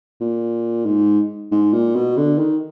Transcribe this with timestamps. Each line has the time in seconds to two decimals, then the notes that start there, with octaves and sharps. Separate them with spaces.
0.21 A#2
0.86 G#2
1.52 G#2
1.73 A#2
1.95 B2
2.17 D3
2.38 D#3